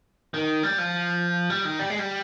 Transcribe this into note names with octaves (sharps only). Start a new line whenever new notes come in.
D#3
G3
F3
G3
D#3
G3
G#3
G3